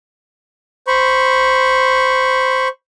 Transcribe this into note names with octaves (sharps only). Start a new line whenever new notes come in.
C5 B5 C#6